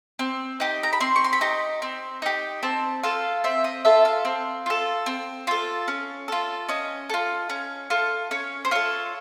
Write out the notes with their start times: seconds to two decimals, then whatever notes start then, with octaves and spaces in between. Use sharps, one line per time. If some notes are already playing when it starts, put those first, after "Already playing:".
0.19 C4
0.60 D#4 G4
0.83 A#5
0.93 B5
1.00 C4 C6
1.16 C#6
1.24 C6
1.33 B5
1.41 D#4 G4 A#5
1.82 C4
2.22 D#4 G4
2.63 C4 A5
3.03 F4 A4 F5
3.44 C4 E5
3.64 D#5
3.85 F4 A4 E5
4.05 F5
4.25 C4
4.66 F4 A4
5.06 C4
5.47 F4 A4
5.88 C#4
6.28 F4 A4
6.69 C#4 D#5
7.09 F4 A4
7.50 C#4
7.90 F4 A4
8.31 C#4 C#5
8.65 C5
8.71 F4 A4 C#5